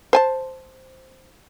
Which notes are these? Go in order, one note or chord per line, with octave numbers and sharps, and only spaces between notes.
C5 G#5 A5